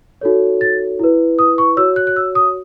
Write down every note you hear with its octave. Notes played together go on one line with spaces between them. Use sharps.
D#4 F#4 A4 C#5
A6
E4 B4
D#6
C#6
F#4 C#5 E6
F#6
F#6
E6
D#6